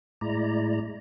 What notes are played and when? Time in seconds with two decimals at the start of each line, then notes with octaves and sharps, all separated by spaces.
0.21 A2 G#3 E4 D5 A#5